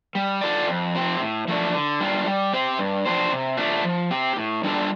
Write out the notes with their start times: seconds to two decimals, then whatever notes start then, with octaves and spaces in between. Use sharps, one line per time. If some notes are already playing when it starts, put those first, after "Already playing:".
0.15 G3
0.41 F4 A4 D5
0.68 F2
0.95 F3 C4 G4
1.20 A2
1.48 F3 A3 D4
1.74 D3
2.00 G3 D4 F4
2.27 G3
2.53 C4 G4 C5
2.78 G2
3.06 F3 D4 G4 C5
3.32 C3
3.57 A3 D4 F4
3.84 F3
4.11 C4 G4
4.36 A2
4.63 G3 D4 F4 A4